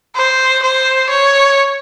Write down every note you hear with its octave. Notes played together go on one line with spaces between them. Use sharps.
C5
C5
C#5